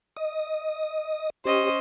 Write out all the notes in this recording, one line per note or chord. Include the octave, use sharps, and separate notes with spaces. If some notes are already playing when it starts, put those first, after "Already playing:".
D#5 D#6
C#4 G4 C5 D#5